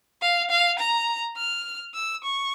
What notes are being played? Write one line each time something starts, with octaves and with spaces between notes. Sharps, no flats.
F5
F5
A#5
F6
E6
C#6